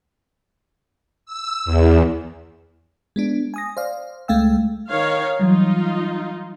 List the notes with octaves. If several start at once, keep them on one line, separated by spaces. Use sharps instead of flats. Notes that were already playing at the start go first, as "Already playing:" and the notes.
E6
E2
G#3 B3 D4
G#5 D#6 A#6
C5 D5 F5
C#2 G#3 A3 F5 G5 E6
D#3 C#5 F5
E3 F#3 G3 D#4 F4